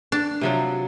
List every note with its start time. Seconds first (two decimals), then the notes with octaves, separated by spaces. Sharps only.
0.12 D4
0.41 C3 F3 F#3